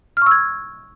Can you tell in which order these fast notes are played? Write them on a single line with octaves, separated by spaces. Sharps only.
F6 C#6 E6 G#6